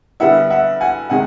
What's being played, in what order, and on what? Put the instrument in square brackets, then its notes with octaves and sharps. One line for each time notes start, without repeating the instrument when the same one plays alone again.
[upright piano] D3 G3 B3 E4 [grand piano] E5 F#5
[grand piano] E5 F#5
F#5 G#5
[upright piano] C3 D#3 G#3 [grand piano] F#5 G#5